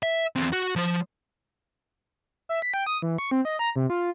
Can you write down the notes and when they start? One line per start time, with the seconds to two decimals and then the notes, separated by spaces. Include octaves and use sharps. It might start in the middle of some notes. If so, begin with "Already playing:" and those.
0.03 E5
0.36 E2 C4
0.52 F#4
0.76 F3 C5
2.49 E5
2.62 B6
2.74 G5
2.86 D#6
3.02 E3
3.18 C#6
3.31 C4
3.45 D#5
3.59 A#5
3.76 C3
3.90 F4